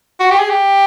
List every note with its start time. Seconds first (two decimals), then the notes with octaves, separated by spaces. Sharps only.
0.20 F#4
0.31 G4
0.40 G#4
0.50 G4